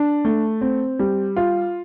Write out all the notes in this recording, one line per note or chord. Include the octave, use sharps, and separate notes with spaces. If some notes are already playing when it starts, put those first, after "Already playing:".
Already playing: D4
A3
C4
G3
F4